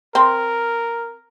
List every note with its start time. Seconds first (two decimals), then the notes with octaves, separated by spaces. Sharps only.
0.15 C4 A#4